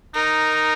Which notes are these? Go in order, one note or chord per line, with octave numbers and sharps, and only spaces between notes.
D#4 A#4